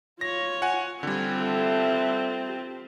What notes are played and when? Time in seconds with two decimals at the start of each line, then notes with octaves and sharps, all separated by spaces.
0.21 F4 C#5 A#6
0.62 F#5 G#5
1.03 D3 G3 C4 F4 G#5
1.40 A4 E5
2.46 G4